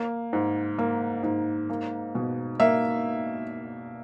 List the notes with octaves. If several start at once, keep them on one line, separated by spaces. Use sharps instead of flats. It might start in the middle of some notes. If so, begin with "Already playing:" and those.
Already playing: A#3
G#2
A#3
G#2
A#3
B2
A#3 E5